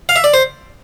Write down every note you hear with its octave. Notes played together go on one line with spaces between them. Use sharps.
F5
E5
D5
C5